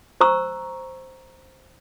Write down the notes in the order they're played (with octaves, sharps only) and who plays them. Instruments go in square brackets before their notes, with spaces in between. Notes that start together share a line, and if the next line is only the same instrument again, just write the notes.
[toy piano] C5 A#5 C#6 E6